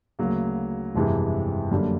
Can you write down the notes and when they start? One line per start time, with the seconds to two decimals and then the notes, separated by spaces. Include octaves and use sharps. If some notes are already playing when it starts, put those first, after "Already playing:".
0.19 D2 C#3 F#3 A#3
0.95 G1 F2 C3 E3 G#3
1.71 F#2 D3 G3 A#3